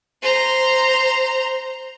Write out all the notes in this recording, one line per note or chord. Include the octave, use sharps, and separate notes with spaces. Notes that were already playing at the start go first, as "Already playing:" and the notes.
C5 A#5